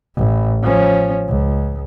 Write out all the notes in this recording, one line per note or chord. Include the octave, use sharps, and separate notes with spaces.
A1
F3 C#4
C#2